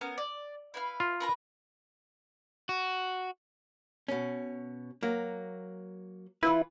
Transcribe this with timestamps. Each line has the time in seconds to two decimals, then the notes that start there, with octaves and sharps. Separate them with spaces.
0.01 B3 C#4 A#4
0.18 D5
0.74 E4 B4 F5
1.00 F4
1.20 A#4 B4 A#5
2.69 F#4
4.08 B2 C#4
5.03 F#3 A#3
6.43 E3 E4 F4 B4